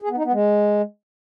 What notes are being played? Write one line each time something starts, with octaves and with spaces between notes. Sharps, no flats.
G#4
B3
D#4
B3
G#3